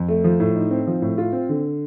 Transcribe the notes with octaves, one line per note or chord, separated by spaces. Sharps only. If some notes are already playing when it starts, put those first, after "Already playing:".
Already playing: F2
A3
F3
A2
D#4
C4
F3
A2
F4
C4
D3